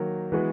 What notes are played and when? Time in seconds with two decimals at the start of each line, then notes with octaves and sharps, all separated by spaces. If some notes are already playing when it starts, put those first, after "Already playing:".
Already playing: D#3 F#3 A#3
0.32 E3 G#3 B3 F#4